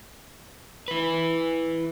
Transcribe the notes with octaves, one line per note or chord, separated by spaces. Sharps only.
E4 B4